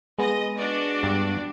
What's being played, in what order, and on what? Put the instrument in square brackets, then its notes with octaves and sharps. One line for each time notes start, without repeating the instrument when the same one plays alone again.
[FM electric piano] G#3 B3 [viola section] D#5
[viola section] D4 F#4 D5
[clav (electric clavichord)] G2